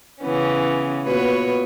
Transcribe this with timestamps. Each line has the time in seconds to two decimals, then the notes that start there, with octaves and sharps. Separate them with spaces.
0.22 C#3 E3 B3 C#4
1.06 A#2 B3 F#4 B4 C#5